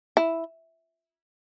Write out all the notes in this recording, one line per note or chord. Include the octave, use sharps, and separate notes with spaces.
E4